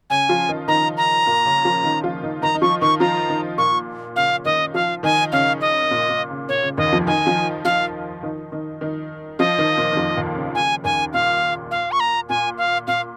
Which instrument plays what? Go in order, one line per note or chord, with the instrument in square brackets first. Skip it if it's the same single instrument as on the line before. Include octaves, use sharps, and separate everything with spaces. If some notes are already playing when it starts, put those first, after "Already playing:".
[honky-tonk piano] C#3 C#4 [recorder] G#5
[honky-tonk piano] F3 F4
D#3 D#4
[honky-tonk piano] D#3 D#4 [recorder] A#5
[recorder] A#5
[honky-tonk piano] A#2 A#3
C#3 C#4
F3 F4
D#3 D#4
F3 F4
D#3 D#4
[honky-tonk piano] D#3 D#4 [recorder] A#5
[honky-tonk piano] D#4
[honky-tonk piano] F3 F4 [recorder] C#6
[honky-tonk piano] D#3 D#4 [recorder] C#6
[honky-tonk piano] F3 F4 [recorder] A#5
[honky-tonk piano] D#3 D#4
[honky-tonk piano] A#2 A#3 [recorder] C#6
[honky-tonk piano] C#3 C#4 [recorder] F5
[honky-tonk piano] D#3 D#4 [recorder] D#5
[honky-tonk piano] F3 F4 [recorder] F5
[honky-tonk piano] D#3 D#4 [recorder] G#5
[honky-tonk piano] C#3 C#4 [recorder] F5
[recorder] D#5
[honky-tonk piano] C#4
A#2 A#3
A#2
C#3
[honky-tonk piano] A#2 [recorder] C#5
[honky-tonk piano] C#3
[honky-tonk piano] D#2 D#3 [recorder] D#5
[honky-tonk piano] F2 F3
[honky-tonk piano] D#3 D#4 [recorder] G#5
[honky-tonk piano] F3 F4
[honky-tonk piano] F3 F4 [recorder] F5
[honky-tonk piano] D#3 D#4
D#3 D#4
D#3 D#4
[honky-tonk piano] F3 F4 [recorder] D#5
[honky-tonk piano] D#3 D#4
A#2 A#3
D#3
F2 F3
D#2 D#3
C#3
[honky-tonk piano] C#3 [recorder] G#5
[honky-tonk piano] D#2 D#3 [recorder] G#5
[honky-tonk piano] A#2 [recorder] F5
[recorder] F5
C#6
A#5
[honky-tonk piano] A#2 [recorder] G#5
[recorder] F5
[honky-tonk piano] A#2 [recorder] F5